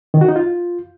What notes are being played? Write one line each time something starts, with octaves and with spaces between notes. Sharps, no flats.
D#3
F#4
D#4
F4